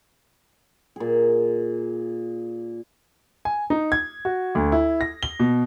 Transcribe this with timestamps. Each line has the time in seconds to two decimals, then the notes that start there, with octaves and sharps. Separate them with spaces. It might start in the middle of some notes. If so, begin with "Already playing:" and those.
0.96 A#2 G#4
3.45 G#5
3.70 D#4
3.92 G#6
4.25 F#4
4.55 D2
4.72 E4
5.01 A#6
5.23 G7
5.40 B2